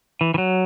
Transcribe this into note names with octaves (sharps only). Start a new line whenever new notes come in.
E3
E3
F#3